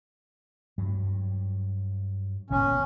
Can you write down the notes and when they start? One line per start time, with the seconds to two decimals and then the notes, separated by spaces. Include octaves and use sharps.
0.78 G2 F#3
2.50 G1 A#2 B3 C#4